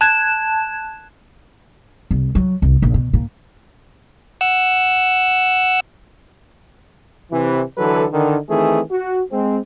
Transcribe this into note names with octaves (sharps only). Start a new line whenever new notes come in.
A5 F#6 G#6 E7
C2
F#3
C2
A#1
B2
A#2
F#5 E6
C3 E3
D3 E3 F#3 A4 B4
D3 D#3
D#3 E3 A3 C4 G#4
F#4
G#3 C4